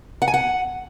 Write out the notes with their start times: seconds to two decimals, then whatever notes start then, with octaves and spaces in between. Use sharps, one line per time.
0.22 F#5
0.28 G#5
0.34 F#5